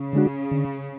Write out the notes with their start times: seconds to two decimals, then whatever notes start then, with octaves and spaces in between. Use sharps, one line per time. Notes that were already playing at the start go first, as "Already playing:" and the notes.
Already playing: C#3
0.13 D3 G#3 D4 F#4
0.51 D3